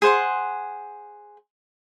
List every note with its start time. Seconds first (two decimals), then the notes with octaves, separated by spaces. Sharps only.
0.02 G#4 C5 F#5 C6